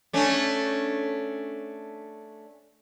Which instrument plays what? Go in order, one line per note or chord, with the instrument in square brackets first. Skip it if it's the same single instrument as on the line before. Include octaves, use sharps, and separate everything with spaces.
[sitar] A3 C#4 D4